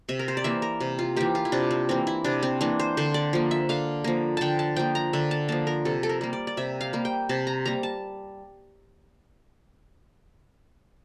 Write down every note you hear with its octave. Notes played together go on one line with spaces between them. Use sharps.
C3 E5
A#4
C5
D5
E3 A#3 E5
A#4
C3
F4
E3 A#3 G4
F4
E4
C3 D4
C4
E3 A#3 C4
E4
C3 D4
C4
E3 A#3 D4
C5
D3 C5
D5
F3 A#3
E5
D3 F5
F3 A#3
D3 G5 A5
A5
F3 A#3 G5
A#5
D3 E5
A5
F3 A#3 A5
A#4
C3 A4
A4
A#4
G3 A#3
D5
D5
C3 E5
F5
G3 A#3
G5
C3 A5
A#5
G3 A#3 A#5
A5